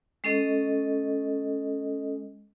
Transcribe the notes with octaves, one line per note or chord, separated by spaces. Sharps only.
G#3 C#4 A4 D#5